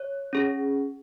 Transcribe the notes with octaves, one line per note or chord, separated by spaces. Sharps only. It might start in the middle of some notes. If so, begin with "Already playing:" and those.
Already playing: C#5
C#4 G#4